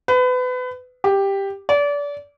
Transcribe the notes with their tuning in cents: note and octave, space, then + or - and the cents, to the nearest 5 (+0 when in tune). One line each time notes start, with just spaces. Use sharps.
B4 +30
G4 +5
D5 -30